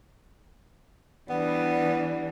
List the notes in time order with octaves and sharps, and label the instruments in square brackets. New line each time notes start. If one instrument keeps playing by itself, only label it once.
[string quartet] E3 G3 D4 [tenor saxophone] B3